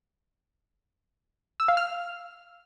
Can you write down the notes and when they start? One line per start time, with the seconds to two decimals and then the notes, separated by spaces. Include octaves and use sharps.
1.60 E6
1.68 F5
1.77 F6